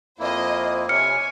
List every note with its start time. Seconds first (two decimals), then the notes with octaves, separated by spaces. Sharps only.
0.19 F2 A#3 E4 C5 D#5
0.89 C3 C#5 G#5 F6 C#7